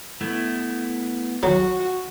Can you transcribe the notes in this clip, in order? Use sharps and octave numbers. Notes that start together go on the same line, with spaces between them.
A3 B3 E4
F#3 F#4